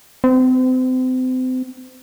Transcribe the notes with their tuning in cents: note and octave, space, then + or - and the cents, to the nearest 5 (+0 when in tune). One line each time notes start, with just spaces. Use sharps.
C4 -35